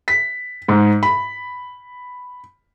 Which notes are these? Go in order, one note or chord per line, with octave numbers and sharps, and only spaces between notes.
B6
G#2
B5